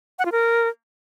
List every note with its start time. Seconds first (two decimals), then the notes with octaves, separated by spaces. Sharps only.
0.19 F#5
0.25 F4
0.32 A#4